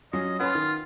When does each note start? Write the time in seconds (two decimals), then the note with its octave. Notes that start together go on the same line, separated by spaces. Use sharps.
0.13 F#3 C#4 F4 D#5
0.40 C#4 F4 B4 F#5
0.55 D#3